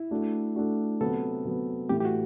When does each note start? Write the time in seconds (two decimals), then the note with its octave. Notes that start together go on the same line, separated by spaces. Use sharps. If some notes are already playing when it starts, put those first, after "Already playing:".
Already playing: E4
0.11 A3 D4 F#4
0.55 A3 D4 F#4
1.01 C3 F#3 B3 A4
1.45 C3 F#3 B3
1.89 A2 E3 A3 G4
2.00 G4
2.05 F#4